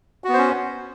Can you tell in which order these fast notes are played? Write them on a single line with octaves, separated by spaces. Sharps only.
F#4 B3 C5 C#4